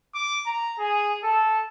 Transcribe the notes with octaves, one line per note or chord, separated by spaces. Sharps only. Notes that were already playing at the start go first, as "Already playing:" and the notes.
D6
A#5
G#4
A4